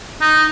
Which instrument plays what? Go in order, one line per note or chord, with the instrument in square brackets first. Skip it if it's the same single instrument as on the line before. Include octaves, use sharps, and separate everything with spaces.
[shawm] D#4